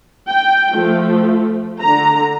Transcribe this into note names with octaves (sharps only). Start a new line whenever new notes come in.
G5
F3 A3
D3 A#5